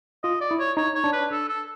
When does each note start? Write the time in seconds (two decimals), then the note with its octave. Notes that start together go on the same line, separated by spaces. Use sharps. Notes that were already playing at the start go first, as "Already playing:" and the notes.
0.24 F4 D#5
0.41 D5
0.51 E4
0.59 C#5
0.77 D#4 C#5
0.95 C#5
1.04 D4
1.13 B4
1.32 A4
1.49 A4